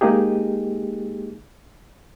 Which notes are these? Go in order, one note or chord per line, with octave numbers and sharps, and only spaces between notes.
G#3 A#3 D#4 G4 G#4